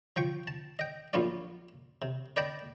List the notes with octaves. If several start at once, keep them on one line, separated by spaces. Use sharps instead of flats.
F3 G5 C#6
A5
D#5 G5
A#1 F#2 B3 C#4 F4 D5
C3
B4 D5 D#5 G5 A5 B5